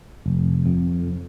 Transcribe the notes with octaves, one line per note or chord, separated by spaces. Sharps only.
F1
F2